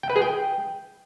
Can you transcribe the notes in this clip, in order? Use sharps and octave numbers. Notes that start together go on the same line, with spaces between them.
G5
B4
G#4
G5